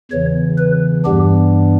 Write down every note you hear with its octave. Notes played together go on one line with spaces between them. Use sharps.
E2 C#3 E3 C#5
B4
G2 E3 G3 B3 D4 G4